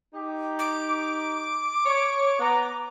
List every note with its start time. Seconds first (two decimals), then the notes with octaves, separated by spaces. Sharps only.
0.14 D#4 G4
0.59 D6
1.86 C#5
2.39 B3 A#5